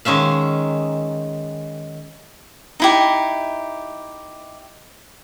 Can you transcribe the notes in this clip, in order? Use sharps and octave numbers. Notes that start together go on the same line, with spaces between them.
D#3 G#3 C#4 E5 F5
D#4 E4 G4